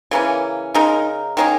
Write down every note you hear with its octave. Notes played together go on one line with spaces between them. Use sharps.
C#3 E3 A#3 C#4
C#3 G#3 D#4 A#4
D#3 A#3 C#4 G#4